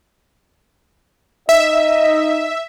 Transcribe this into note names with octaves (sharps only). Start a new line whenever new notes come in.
D#4 D#5 E5